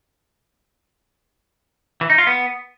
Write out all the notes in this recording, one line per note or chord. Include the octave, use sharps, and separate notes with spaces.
E3
D#4
F4
B3